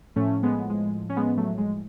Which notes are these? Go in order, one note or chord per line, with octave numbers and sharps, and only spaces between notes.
A2 F3 A3 C#4
G#3 B3
G#3
C#4
G#3 B3
F#3 A3
G#3